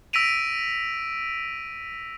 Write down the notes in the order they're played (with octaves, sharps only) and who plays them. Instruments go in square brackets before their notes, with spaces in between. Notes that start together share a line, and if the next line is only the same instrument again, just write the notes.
[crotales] E6 A#6 B6 D7 D#7 F7